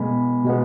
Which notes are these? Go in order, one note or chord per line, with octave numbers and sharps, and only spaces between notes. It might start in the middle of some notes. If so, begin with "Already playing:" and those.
Already playing: B2 G#3 B3 G#5 B5
B2 G#3 B3